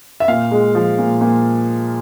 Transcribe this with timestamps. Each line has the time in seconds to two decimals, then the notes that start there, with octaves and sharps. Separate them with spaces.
0.20 E5
0.28 A#2 F5
0.51 G#3
0.75 F3
0.99 A#2
1.21 A#2